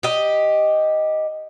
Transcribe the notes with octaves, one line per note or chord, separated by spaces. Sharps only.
G4 D#5